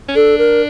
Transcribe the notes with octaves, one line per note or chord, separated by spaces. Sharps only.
C#4
D4 A4
A#4